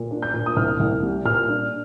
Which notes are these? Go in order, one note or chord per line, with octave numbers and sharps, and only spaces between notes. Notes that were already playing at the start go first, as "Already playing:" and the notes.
Already playing: A#2
D4
G6
A#2
D#6
C2 F6
C2
G3
A#2 F6
D4